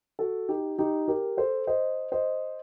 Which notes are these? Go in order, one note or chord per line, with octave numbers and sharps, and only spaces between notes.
F#4 A4
D#4 G4
D#4 G4
G4 A#4
A4 C5
C5 D#5
C5 D#5